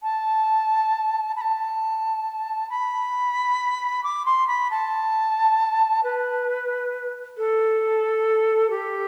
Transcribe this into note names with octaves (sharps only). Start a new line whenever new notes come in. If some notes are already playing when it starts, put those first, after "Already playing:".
A5
B5
A5
B5
D6
C6
B5
A5
B4
A4
G4